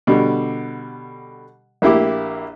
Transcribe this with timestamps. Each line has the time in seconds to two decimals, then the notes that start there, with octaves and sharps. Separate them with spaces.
0.07 B2 D3 G3
1.82 A#1 A#3 E4 G4 D6